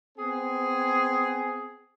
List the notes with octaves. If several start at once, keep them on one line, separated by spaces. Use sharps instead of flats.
B3 C4 G#4